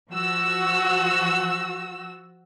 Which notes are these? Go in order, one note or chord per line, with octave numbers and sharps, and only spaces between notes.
F3 F#4 E6